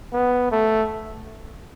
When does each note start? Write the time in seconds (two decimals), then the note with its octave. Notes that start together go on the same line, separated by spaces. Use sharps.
0.13 B3
0.52 A3